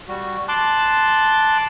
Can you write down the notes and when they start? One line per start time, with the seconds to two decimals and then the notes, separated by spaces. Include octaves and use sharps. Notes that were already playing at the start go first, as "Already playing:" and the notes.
0.08 G3 F#4
0.48 A5 C6 D6 F#6